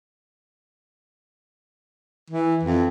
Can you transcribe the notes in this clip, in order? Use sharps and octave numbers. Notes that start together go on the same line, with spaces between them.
E3
F2